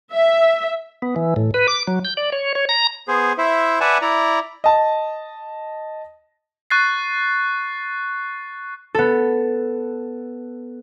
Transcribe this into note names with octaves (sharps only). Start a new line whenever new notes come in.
E5
B3
E3
A2
B4
D6
F#3
G6
D5
C#5
C#5
A#5
B3 G#4 C5
E4 C5 E5
B4 D5 E5 F#5 G#5 A5
E4 D5 A#5
D#5 A5
C#6 F#6 A6 C7
B3 A4